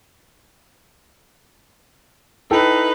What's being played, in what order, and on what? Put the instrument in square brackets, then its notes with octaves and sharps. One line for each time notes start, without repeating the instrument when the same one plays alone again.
[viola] D#4 B4 [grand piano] E4 A4 G5